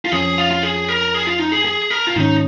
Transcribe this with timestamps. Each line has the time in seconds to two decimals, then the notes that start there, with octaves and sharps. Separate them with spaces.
0.05 F4
0.12 F2 F3 C#4 G#4
0.38 F4
0.51 F4
0.63 G#4
0.88 A#4
1.14 G#4
1.27 F4
1.39 D#4
1.52 G#4
1.65 G#4
1.90 A#4
2.07 F4
2.16 G#2 D#3 C#4 D#4